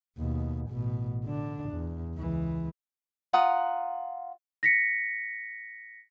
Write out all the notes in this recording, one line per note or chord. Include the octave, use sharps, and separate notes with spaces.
D#2 B2
A1 B2
D3 D4
E2
C#2 E3
F4 F#5 A#5 D#6
A#6 B6 C#7